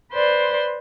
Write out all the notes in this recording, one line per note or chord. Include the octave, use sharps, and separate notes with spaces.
B4 C5 D5 C6